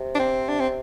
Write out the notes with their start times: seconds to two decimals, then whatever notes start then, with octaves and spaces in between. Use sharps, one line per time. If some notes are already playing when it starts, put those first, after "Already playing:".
Already playing: C3
0.15 D4
0.19 C4
0.48 D4
0.60 C4